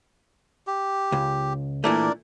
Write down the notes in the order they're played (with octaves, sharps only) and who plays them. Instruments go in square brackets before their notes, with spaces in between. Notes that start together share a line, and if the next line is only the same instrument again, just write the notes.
[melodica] G4
[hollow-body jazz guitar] C#2
[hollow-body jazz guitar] A#2 E3 A3 [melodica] D4 A#4 D5